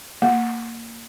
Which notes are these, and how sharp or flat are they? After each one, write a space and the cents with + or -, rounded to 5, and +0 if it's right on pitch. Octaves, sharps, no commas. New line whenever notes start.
A#3 -20